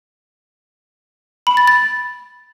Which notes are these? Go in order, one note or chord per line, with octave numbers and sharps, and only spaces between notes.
B5
A6
A6